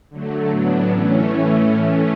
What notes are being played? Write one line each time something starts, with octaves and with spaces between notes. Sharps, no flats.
D3 F#3 A3
A2 F#3 B3 D4
A2 E3 A3 C#4